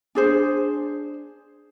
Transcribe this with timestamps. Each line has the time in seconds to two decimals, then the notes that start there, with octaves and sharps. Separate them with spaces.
0.15 D4 G#4 C5